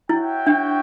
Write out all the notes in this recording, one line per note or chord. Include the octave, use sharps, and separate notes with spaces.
E4 F#4 C#5 E5 G5
D4